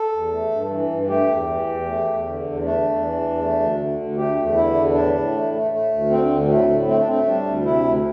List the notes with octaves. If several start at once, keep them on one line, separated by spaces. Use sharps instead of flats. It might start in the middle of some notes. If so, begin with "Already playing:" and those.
Already playing: A4
E2
A3
G2
E3
G2
A3 G4
E2
E3
E2
A3
E2
D3
E2
A3 D4
E2
E3
E2
A3
D2
D3
D2
A3 G4
E2
D3 E4
E2
A2 D4
A2
A3
A3
A3
D2
D3 C4
D2
A2 A3
A2
A3 C4
D4
A3 C4
G3 D4
D2
C3 E4
D2